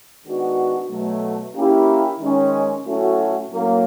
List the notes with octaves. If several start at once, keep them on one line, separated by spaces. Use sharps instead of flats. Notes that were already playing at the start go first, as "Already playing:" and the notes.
D#3 G#3 B3 D4 F#4
B2 F#3 A3
A#3 C#4 E4 G4
D#3 G#3 C#4
A2 F#3 A3 C#4 F#4
A2 F#3 A#3 C#4